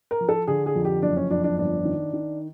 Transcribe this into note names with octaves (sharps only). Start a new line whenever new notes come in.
A#4
F3
A4
D3 G#4
G#4
F2
G4
F#1 D4
C#4
F2 D4
D4
G1 D4
D#3
D#3